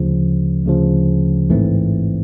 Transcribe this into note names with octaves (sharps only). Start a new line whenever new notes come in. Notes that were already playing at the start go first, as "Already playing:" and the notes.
Already playing: D2 C#3 F3
D2 C#3 F3
A1 G#2 E3 A3 C4